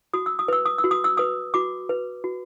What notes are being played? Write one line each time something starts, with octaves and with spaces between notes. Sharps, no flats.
F#4 D#6
E6
D#6
B4 E6
D#6
E6
F#4
D#6
E6
B4 D#6
F#4 D6
B4
F#4